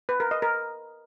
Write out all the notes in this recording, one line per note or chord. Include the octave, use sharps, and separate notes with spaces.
B4
A#4
D#5
A#4